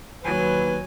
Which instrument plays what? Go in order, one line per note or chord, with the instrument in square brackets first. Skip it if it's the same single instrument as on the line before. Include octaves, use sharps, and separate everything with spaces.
[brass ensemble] D#2 B4 [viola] F#3 G#5